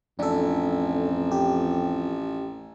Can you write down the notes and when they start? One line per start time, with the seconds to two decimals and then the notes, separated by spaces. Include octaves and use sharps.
0.19 A1 F2 D4 A4
1.31 G4